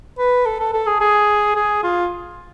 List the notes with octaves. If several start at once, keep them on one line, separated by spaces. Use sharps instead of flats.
B4
A4
A4
A4
G#4
G#4
G#4
F4